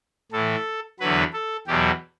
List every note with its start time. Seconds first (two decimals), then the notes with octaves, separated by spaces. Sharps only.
0.32 A2 E3 A4
1.00 E2 D3 F#3 B4
1.33 A4
1.67 E2 B2 F#3 G4